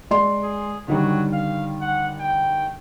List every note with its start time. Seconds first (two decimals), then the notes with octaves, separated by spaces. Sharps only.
0.11 G#3 D5 C6
0.43 G#4
0.88 D3 D#3 F#3 G3
1.33 F5
1.81 F#5
2.20 G5